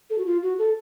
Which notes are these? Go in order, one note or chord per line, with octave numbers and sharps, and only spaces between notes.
A4
F#4
F4
F#4
A4